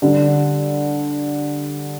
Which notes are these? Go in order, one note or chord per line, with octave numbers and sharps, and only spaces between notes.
D3 G3 D4